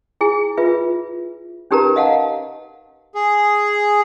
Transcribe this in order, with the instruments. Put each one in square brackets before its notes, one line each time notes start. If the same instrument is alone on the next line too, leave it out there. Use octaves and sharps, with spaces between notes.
[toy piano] E4 G#4 G#5
F4 B4 E5
C#4 D#4 G4 A#4 B4 A#5
D#5 F5 F#5 A5
[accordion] G#4